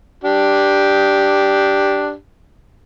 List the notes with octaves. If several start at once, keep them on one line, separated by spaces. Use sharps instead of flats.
D4 G4